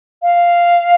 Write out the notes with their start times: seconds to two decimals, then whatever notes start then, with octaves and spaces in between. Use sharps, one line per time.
0.22 F5